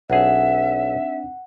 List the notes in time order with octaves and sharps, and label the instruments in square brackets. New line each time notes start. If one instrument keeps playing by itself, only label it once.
[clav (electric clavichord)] B1 G#4 [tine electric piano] C4 D4 D#4 [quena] E5 [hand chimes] F#5